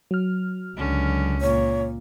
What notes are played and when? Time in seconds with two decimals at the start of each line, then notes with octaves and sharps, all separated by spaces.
0.11 F#3 F6
0.77 C#2 D3 C#4
1.41 A#2 C#5